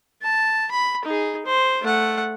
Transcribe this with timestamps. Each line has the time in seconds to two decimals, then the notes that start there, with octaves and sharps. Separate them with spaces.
0.22 A5
0.71 B5
1.05 D#4 G#4
1.45 C5
1.82 A3 F#5